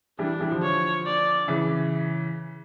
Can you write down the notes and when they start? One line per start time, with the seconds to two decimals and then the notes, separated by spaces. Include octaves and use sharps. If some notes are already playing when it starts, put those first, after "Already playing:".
0.19 E3 G3 D4
0.41 E3 G3
0.51 D3 F3
0.62 C#5
1.06 D5
1.48 C#3 E3